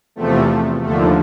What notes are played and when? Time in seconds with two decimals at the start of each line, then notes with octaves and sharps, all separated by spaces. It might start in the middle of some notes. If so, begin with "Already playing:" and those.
0.16 E2 C3 F3 A3
0.83 D#2 D3 F3 A3